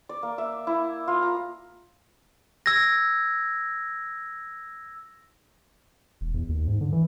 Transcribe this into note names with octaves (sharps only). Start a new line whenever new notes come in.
D5
A#3
E5
E4
F4
A#5
E6 G#6 A#6
E1
E2
D#2
G#2
D3
E3